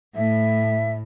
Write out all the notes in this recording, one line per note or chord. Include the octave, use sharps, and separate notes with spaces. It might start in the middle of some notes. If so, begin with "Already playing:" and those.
A2 E5